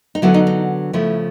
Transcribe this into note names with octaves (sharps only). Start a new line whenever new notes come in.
D#4
D3 F#3 B3 E4
D#4
D#4
C#3 F3 A3 E4